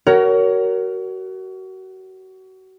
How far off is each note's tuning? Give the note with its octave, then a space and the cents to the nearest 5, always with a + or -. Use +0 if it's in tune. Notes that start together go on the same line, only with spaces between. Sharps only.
F#4 +30 A#4 +0 C#5 +15